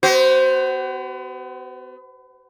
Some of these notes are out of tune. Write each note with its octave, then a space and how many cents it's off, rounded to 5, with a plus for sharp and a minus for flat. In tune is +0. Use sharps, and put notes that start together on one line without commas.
B3 +35 F#4 +35 C5 +0